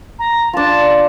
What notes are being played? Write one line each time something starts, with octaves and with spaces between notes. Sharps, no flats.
A#5
D4 F4 A5